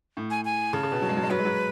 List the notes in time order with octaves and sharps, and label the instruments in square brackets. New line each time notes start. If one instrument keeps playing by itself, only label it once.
[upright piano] A2
[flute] G#5
G#5
[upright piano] C#3 [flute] A5
[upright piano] C#3
B2
F#3
G#3
F#3
G#3
[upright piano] F#3 [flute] B4
[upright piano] G#3
F#3